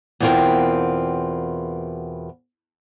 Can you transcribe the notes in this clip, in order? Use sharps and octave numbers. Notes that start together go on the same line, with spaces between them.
E2 B2 C4 F4 A#4 G5